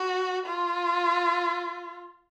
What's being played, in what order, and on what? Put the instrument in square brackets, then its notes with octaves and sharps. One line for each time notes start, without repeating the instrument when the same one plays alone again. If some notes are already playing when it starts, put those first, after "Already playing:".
Already playing: [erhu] F#4
F4